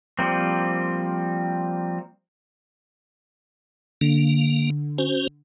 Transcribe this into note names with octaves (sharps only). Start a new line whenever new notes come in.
F3 G3 A#3 C4
D3 A#3
C#4 F#4 C5